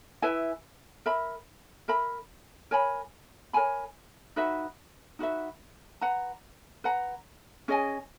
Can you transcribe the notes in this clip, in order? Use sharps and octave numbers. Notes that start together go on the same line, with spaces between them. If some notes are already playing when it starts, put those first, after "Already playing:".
E4 B4 E5 G#5
A#4 E5 B5
A#4 E5 B5
A#4 C#5 G#5 B5
A#4 C#5 G#5 B5
D#4 F#4 B4 E5
D#4 F#4 B4 E5
B4 F#5 A#5
B4 F#5 A#5
C#4 G#4 D#5 G#5